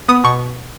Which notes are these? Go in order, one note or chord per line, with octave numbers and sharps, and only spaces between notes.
B3 D#6
B2 C#6